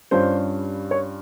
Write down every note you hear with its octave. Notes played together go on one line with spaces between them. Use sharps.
G2 G3 C#4 F4 C5
C#5